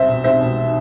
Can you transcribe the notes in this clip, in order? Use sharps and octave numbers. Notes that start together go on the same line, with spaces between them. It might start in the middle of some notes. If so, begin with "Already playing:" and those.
Already playing: C2 C5 E5
B2
C2 C5 E5
B2